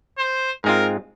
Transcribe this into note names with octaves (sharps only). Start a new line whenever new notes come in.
C5
G#2 G#3 C4 F4 A#4